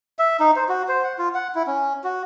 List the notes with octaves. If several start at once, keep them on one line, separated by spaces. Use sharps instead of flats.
E5
D#4
C5
F#4
C5
F#5
F4
F#5
E4
C#4
F#4